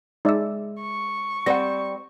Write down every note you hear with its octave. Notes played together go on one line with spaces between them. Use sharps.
G#3 D#4 D5 E5 E6
C#6
G3 C4 F#5 A#6